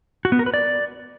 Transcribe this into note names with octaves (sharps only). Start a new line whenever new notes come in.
F#4
B3
A#4
B4
D5